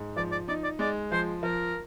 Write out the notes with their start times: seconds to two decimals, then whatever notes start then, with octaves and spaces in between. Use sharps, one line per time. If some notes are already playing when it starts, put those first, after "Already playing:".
Already playing: G#2
0.16 F3 D5
0.32 D5
0.48 D#4 D5
0.64 D5
0.79 G#3 D5
1.12 F3 C5
1.43 F3 A#4